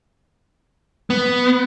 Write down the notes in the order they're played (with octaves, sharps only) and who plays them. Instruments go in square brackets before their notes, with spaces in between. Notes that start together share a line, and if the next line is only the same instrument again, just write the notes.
[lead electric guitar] B3